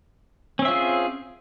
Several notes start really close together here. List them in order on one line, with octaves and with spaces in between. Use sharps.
C#4 C4 E5 F4 G#4